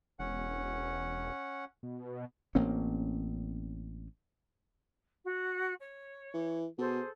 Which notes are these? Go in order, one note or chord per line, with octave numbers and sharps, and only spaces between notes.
E1 C#4 F#5
B2
A1 A#3 C4 C#4
F#4
C#5
E3
B2 G#4 A4 C5